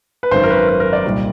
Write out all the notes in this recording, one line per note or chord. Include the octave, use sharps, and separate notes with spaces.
B4
G#1 F#2 D#3 C5
A#4
B4
A#4
A#4
D5
C2 A#2 G3 A#3 D#4